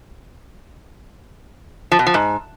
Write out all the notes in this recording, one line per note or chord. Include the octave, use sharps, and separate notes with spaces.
F3
B2
F3
G#2